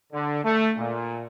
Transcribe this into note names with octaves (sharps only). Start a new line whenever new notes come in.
D3
A3
A#2